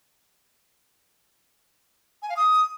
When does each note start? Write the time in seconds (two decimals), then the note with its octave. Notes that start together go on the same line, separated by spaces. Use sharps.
2.22 G#5
2.30 F5
2.37 D#6